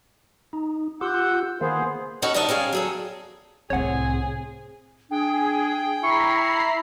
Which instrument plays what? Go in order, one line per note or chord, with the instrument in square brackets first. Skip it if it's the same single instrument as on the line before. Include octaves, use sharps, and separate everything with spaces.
[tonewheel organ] D#4
[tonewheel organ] F4 G4 [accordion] F#5 E6 G6
[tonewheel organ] D#3 A#3 [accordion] B3 G#4 C5
[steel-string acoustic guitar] C#4 F#4 A4 B4 D#5
D#3 G3 D4 D#5 E5 A5
G3 C#4 G#4 F5
F#3 G#4 A4
[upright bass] C2 A2 [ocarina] C4 [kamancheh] G#4 [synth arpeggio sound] C#5 F#5
[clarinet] D4 [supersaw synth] G#4 [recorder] G5
[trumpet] E4 [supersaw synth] A#5 B5 C7 [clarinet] C#6